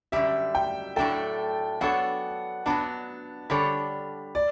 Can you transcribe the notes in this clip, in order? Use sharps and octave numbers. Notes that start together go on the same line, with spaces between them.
F#2 D3 G3 E5
G5
A2 F#3 A3 D4 A4 G5
F#3 B3 D4 A4 C#5 F#5
F#3 B3 D4 A5
D3 G3 D4 A4 C#5 B5
D5